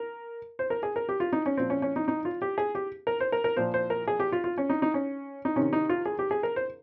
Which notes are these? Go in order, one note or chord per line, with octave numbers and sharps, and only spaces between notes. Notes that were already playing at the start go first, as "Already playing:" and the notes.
Already playing: A#4
C5
A#4
G#4
A#4
G4
F4
D#4
C#4
A#2 F3 C4
C#4
C#4
D#4
D#4
F4
G4
G#4
G4
A#4
C5
A#4
A#4
A#2 F3 C5
C5
A#4
G#4
G4
F4
F4
C#4
D#4
D#4
C#4
D#4
C3 D#3 C#4
D#4
F4
G#4
G4
G#4
A#4
C5